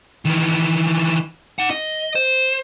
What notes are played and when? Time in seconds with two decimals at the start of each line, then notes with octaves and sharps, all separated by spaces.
0.25 D#3 E3
1.59 D#4 F#5
1.71 D#5
2.15 C5